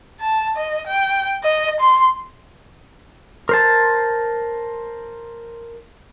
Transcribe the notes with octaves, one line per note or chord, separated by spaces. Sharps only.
A5
D#5
G5
D#5
C6
A#4 C5 A5